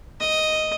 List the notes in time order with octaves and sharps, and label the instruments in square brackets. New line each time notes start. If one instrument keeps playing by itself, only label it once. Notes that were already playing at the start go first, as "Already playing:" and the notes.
[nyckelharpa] D#5